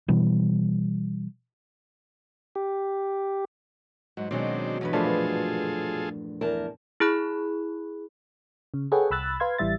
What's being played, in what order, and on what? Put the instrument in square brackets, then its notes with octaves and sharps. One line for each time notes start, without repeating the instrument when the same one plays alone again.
[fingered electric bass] B2 E3 G3
[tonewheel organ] G4
[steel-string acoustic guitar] G#2 [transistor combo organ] F#3
[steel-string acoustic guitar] B2 F#3 G#3 [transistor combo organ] D#3 C4 D4
[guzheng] E2 G2 B4
[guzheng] E2 A#2 [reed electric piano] F3 A3 D4 [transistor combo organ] F4 G#4 A4
[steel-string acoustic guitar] E2 A#4 A5
[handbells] E4 G#4 B5 F#6
[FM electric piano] C#3
G#4 A4 B4 C#5 F#5 G5
C2 B5 E6 F#6 A6
B4 F5 C6 G#6
A1 E3 G3 E5 A6